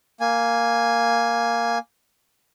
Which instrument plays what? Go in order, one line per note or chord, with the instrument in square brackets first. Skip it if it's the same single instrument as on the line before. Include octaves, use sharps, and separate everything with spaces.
[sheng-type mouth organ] A#3 G#5